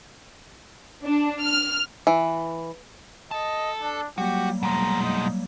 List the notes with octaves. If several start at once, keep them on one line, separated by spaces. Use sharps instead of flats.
D4
F6
E3
A4 D#5 A5
D4
F#3 G3 A#3 F#4 G4
B2 G#3 A#5
D#4